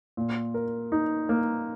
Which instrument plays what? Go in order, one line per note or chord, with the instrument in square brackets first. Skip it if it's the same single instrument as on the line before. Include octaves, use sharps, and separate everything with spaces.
[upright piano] A#2
A#4
D#4
A#3